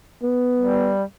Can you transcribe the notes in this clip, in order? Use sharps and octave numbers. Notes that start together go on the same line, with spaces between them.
B3
G3